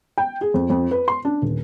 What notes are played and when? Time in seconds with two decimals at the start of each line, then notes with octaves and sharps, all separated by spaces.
0.18 G5
0.41 G#4
0.54 F2
0.70 F2
0.91 B4
1.08 C6
1.25 D4
1.42 D#1